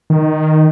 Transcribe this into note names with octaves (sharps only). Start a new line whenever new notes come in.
D#3